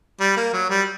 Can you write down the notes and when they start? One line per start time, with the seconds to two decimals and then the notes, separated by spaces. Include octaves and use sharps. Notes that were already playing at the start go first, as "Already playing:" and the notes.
0.20 G3
0.37 A#3
0.53 F#3
0.70 G3